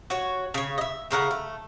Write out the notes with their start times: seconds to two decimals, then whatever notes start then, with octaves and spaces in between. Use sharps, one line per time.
0.10 F#4 C#5
0.54 C#3 C#5
0.78 D#5 E5
1.11 A2 C#3 A#4 F#5
1.31 A3